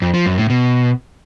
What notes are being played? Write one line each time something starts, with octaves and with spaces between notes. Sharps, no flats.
F2
F3
F#2
A2
B2